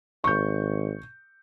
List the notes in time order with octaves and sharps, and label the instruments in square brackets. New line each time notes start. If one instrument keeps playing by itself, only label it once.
[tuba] G#1 [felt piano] C#6 G6